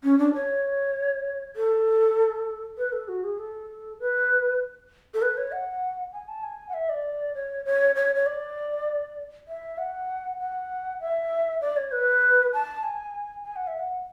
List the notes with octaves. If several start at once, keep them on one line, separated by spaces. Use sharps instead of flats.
C#4
D4
C#5
A4
B4
A4
F#4
G#4
A4
B4
A4
B4
C#5
F#5
G#5
A5
G#5
F#5
E5
D5
C#5
C#5
C#5
C#5
D5
E5
F#5
F#5
E5
D5
C#5
B4
A5
G#5
G#5
F#5
E5
F#5